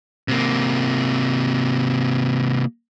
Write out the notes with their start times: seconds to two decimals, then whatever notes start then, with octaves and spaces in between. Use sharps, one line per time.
0.28 C3 A#3